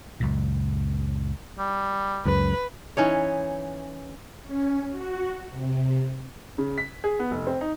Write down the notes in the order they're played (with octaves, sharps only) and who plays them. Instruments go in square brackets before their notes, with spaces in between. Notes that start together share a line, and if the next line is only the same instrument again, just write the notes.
[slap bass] C#2 F#2 A#2
[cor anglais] G3
[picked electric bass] C#2 F#2 [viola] B4
[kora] E3 C#4 D#4 C#5
[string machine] C#4
F#4
C3
[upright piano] C#3
B6
G#4
B3
F1
C4
D#4